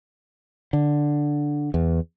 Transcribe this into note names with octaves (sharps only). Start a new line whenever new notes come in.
D3
E2